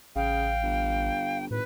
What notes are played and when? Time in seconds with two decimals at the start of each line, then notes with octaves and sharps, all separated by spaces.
0.16 A1 C#3 F5 G5
0.63 G1
1.51 G#1 A2 B4